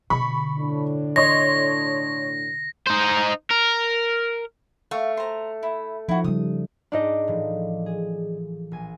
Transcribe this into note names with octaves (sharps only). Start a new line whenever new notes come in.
B2 D3 B5 C#6
A2 D4
C#5 D#5 C6 A#6
D#4 C5
A#4
A3 F5 C#6
C5 A#5
E4
F3 D#4 E4 F#4
C#3 G3 D#6
G#2 D4 D#4 D#5 D6
A2 E3 F3
G#4
A#1 G#5